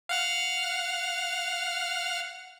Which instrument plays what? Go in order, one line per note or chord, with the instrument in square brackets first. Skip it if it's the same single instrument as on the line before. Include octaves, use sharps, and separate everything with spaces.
[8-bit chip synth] F5 F#5 F6